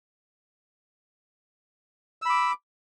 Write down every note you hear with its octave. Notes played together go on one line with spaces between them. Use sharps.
B5 D6 E6